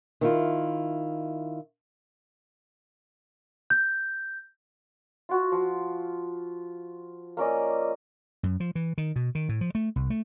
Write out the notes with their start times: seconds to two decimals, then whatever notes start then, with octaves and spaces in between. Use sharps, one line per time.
0.21 D#3 E4 F4
3.70 G6
5.29 F4 F#4
5.52 F3
7.37 A#3 C#4 D5 D#5
8.43 F#2
8.60 F3
8.75 E3
8.98 D#3
9.16 B2
9.35 D#3
9.49 A2
9.61 F3
9.75 A3
9.96 C2
10.10 A3